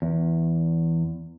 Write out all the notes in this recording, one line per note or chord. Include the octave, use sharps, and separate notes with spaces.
E2